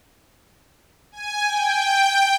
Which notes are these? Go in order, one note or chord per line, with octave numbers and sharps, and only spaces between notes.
G#5
G5